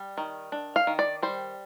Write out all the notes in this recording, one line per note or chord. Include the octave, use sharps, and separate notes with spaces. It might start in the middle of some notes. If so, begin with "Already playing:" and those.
Already playing: G3
D#3
D4
F5
D#3
D5
G3 C5